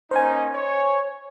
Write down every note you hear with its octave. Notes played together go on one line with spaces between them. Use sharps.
A#3 C#4 D#4 C5 G#5
C#5